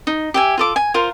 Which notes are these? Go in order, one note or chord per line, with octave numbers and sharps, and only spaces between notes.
D#4
G4 E5 G#5
F4 A4 D6
G#5
F4 A#4 C5